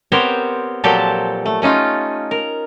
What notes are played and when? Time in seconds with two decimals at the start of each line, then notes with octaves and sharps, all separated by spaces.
0.12 B3 C4 G4 A#4 C5 C#5
0.84 A#2 F3 F#3 G4 A4 A5
1.46 A3
1.62 A3 C#4 D#4 F4
2.31 A#4